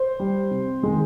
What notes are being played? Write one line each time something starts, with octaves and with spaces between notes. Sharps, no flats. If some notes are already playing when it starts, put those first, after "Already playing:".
Already playing: C5
G3
C3
D#3 G#3